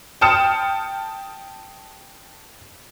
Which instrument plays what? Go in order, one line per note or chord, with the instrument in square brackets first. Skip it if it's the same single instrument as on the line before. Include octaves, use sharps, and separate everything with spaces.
[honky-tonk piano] G5 A5 D#6 F6 C#7 E7